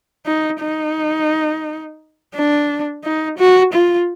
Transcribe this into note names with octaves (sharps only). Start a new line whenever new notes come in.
D#4
D#4
D4
D#4
F#4
F4